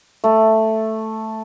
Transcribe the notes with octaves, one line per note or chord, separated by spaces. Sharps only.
A3